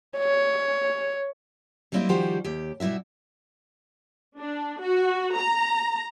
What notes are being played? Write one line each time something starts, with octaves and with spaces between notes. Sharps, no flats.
C#5
F#3 G3 A#3 C4 E4 D#5
D#3 F3 G3 F#4 G4 C5
D#2 G4
B2 G3 E4 F#4 E5
D4
F#4
A#5